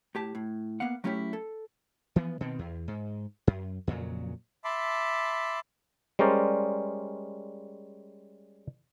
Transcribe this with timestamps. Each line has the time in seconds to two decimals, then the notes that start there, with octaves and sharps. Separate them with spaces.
0.15 A2 G4 A5
0.35 A2
0.80 A#3 B3 F5 F#5
1.04 F#3 A3 C#4 E4 G4
1.33 A4
2.16 E3 F3 B3
2.41 B2 D#3 C4
2.59 E2
2.88 G#2
3.47 F#2
3.87 F2 A#2 C#3 F#3
4.64 E5 A5 B5 C6 D6
6.19 G3 G#3 C#4 A#4 C5 D5